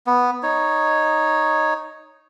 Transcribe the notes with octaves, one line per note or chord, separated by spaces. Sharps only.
B3
D#4 C#5